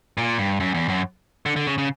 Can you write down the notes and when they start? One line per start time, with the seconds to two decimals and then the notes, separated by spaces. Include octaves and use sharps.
0.17 A#2
0.39 G2
0.60 F#2
0.74 E2
0.88 F#2
1.46 D3
1.56 D3
1.67 C#3
1.78 C#3